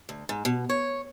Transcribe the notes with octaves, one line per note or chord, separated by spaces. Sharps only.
D2
G#2
B2
C#5